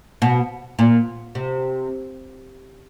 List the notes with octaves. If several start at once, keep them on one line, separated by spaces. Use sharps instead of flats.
B2
A#2
C3